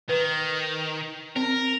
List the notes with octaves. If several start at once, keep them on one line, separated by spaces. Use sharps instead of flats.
D#3 B4
C4 A#4